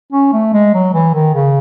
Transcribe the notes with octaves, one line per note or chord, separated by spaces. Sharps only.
C#4
A3
G#3
F#3
E3
D#3
C#3